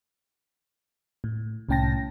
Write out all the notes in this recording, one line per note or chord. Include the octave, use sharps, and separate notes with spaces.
A2
C2 A2 C#4 G5 A5 A#6